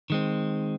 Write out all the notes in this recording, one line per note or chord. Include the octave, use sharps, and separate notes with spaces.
D#3 G#3 C4